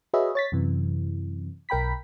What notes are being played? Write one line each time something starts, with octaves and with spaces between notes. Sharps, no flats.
F#4 G#4 B4 C#5 D#5 E5
C#5 A6 B6
F#2 C3 E3
B1 A#4 G5 B5 B6